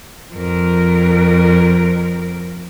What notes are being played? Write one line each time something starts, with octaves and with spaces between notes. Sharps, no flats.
F2 A#4